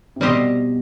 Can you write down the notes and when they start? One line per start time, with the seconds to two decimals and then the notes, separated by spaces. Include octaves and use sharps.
0.16 C3
0.20 B2 G3 C4 G4 C5 D#5